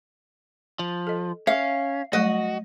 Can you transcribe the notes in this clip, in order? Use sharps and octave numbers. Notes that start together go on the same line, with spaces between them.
F3
A4 D#5
C#4 E5 F5
F#3 G3 A3 F#4 D#5